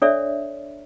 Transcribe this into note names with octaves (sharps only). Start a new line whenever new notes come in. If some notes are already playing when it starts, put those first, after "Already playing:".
D4 A4 C#5 D5 E5